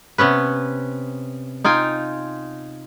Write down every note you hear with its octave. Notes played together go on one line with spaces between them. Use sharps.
C3 B3 C#4 B4
D#4 F4 G5 G#5